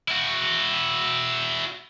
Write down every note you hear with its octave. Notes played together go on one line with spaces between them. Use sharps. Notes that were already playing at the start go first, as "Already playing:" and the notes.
E4 F#4